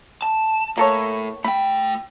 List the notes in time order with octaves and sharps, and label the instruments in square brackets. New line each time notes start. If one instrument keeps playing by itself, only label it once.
[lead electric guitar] A5
[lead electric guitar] A2 [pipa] A#3 A4 C#5
[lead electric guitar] A3 G5 [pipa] B5